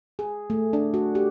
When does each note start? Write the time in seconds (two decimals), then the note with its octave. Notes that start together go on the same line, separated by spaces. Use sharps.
0.19 G#4
0.50 A3
0.73 D4
0.94 F#4
1.15 G4